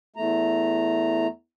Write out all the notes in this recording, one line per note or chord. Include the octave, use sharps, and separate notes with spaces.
E2 A3 A#5